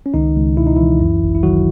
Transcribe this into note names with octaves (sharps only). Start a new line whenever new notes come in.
C#4
C#2 D#3 D#4
C#2
B2 E4
D#4
C#2 E3 E4
F#2
G#1
E4
D#3 F#3 F#4